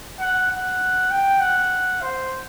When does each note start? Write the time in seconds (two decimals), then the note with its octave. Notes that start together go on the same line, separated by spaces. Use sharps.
0.19 F#5
0.51 F#5
1.11 G5
1.40 F#5
2.02 C5